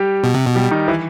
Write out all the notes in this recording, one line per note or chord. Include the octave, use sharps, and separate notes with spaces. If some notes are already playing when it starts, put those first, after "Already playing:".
Already playing: G3 G4
B2
C3
B2
G3 G4
D#3 D#4
E3 E4